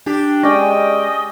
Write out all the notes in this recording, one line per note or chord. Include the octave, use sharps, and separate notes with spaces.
D4 G4
G#3 C#4 D5 D#5 G5